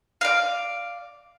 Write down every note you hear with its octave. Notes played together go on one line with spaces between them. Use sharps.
D5 F5